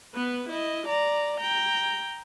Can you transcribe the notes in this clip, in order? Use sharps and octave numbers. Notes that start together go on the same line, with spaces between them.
B3 B4
E4 D#5
D5 A#5
G5 A#5